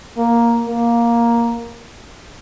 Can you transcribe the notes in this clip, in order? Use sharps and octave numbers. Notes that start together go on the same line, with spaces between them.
A#3
A#3